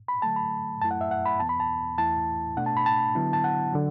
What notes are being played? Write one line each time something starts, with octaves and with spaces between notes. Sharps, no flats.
B5
D3 F#3 A3 A5
B5
F#2 F#3 A3 E4 A5
F#5
E5
F#5
B5
E2 E3 B3 A5
B5
A5
E2 E3 A3 E4 A5
B2 A3 D4 F#5
A5
B5
A5
D3 F#3 B3 E4
A5
F#5
D3 F#3